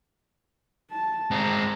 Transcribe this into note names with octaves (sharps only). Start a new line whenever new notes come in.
A5
G#3 C4 A#5